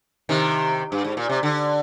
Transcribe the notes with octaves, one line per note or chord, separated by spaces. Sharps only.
C3 D#3
G2
G#2
A#2
C3
D3